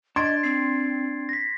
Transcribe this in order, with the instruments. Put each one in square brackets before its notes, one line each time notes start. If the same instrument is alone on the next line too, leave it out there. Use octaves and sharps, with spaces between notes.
[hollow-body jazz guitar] D4 [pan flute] D#5 [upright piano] C6 [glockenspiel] G#6 A6 D7
[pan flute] C4 [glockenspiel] C7
[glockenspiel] A#6 B6